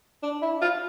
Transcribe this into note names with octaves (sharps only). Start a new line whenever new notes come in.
D4
E4
F4